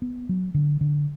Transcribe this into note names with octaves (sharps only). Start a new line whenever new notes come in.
B3
F#3
D3
D3